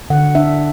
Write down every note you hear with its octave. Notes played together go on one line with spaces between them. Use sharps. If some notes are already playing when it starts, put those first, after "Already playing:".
D3 F#5
D4 E5